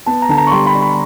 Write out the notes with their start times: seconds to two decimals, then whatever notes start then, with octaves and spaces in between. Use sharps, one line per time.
0.06 B3 A5
0.22 A#5
0.29 D3 A5
0.37 A#5
0.47 C#6
0.51 G3 C6
0.66 B5
0.75 D4
0.81 B5